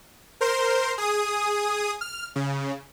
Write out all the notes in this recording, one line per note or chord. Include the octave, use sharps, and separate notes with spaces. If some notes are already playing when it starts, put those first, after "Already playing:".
A#4 C5 C6
G#4 D#6
F6
C#3